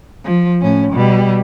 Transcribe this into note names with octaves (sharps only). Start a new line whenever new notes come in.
F3
A2 C#4
B2 G3